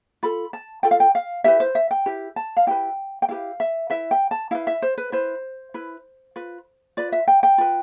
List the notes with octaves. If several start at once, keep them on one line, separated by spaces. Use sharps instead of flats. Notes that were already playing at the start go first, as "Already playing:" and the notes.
F4 A4 B5
A5
F4 A4 G5
F5
G5
F5
E4 G4 B4 E5
C5
E5
G5
E4 G4 B4
A5
F5
E4 G4 B4 G5
G5
E4 G4 B4 F5
E5
E4 B4 E5
G5
A5
E4 B4 F5
E5
C5
B4
E4 B4 C5
E4 B4
F4 B4
F4 B4 D5
E5
G5
G5
F4 B4